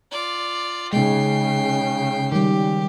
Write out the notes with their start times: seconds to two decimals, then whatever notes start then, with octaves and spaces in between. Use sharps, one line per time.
0.12 F4 D5
0.93 C#3 G#3 D#4 G5 C7
2.32 D#3 G3 G4